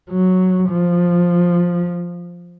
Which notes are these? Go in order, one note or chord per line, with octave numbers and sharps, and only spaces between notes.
F#3
F3